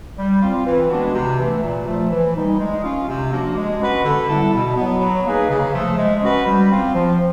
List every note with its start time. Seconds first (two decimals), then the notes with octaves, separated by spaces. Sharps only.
0.18 G3
0.42 C4 F4
0.66 E3
0.90 G#3 B3 D4 F#4
1.14 C3
1.38 E3 A3
1.63 A#2
1.87 F3 A3
2.11 E3
2.35 G3 A#3 D#4
2.60 G#3
2.84 C#4 F4
3.08 C3
3.32 F3 A#3 D4 F#4
3.57 G#3
3.80 C#4 F#4 B4
4.04 D3
4.29 G3 B3 E4 A4
4.53 B2
4.77 F#3 B3
5.01 F#3
5.25 A#3 D#4 G#4 B4
5.50 C#3
5.73 F3 A3
5.98 G#3
6.22 C#4 F#4 B4
6.46 G3
6.70 C4 F4
6.94 F3